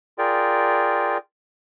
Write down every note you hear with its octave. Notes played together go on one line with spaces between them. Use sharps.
F4 G#4 A#4 D5 G5